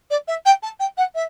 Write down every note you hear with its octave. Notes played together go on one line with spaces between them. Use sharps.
D5
E5
G5
A5
G5
F#5
E5